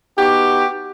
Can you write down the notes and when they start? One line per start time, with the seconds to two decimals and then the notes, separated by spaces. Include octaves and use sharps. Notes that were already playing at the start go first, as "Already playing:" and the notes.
0.18 B3 D#4 F#4 G4